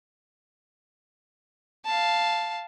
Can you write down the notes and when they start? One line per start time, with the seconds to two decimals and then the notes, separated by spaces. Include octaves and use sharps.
1.85 F5 A5